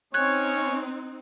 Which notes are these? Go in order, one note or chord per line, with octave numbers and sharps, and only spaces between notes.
C4 C#4 D#4 C#5 F#6 G#6